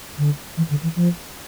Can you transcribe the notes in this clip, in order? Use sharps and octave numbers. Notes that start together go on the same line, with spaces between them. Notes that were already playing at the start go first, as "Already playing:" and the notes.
D3
E3
D3
E3
F3